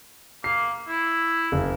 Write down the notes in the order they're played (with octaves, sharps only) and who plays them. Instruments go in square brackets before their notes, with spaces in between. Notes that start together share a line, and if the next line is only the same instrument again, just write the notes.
[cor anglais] A#3 [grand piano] C7
[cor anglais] E4
[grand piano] F#1